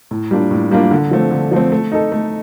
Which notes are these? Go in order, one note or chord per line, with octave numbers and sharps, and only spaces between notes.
A2
G3 A#3 D4 F4
A2
G3 A#3 D4 F4
D3
F3 A3 C4
D3
F3 A3 C4
A3
D#4 A4
A3